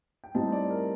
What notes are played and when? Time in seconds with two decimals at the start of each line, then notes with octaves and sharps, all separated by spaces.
0.24 G5
0.35 A2 G3 C4 D#4 A5
0.52 D5
0.70 A#4